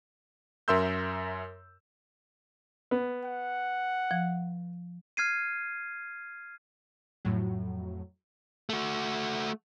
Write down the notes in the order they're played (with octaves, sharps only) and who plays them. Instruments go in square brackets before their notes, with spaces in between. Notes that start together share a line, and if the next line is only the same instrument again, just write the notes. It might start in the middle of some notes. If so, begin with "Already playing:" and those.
[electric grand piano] F#2 A#4 E5 C6 E6 G6
[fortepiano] B3
[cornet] F#5
[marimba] F3
[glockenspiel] F6 G#6 C7 D#7
[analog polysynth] F2 A2 F#3
[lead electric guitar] A3 F#4